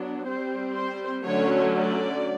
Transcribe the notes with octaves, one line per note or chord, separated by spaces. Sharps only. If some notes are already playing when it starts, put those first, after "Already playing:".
Already playing: F#3 B3 D4
G3 C4 C5
C5
D3 F#3 A3 C#4 C#5
D5